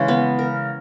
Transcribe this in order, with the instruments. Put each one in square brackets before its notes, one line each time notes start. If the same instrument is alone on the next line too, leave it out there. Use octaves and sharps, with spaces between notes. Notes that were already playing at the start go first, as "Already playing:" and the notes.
Already playing: [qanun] C#3 E3 G#3 C#4
B3
A#4